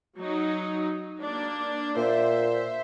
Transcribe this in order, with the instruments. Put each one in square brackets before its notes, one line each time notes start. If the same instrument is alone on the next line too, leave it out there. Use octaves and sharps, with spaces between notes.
[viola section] F#3 D#4
A#3 D4
[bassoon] A#2 [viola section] C5 E5